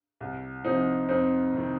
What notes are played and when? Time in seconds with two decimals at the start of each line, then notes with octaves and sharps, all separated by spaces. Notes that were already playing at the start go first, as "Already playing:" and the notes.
0.21 C2
0.64 C3 F3 C4 D#4
1.08 F2 C4 D#4
1.53 C3 D#3